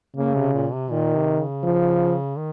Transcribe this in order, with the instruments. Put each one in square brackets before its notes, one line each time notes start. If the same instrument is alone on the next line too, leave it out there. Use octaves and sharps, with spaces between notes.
[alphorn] C#3 [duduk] A#3
[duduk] C3
A#2
C3
[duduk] A#2 [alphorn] D#3
[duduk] C3
C#3
[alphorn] F3
[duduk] D#3